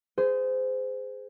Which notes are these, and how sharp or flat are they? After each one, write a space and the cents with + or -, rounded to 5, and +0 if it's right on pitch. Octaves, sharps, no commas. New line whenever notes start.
G#4 +0 C5 -25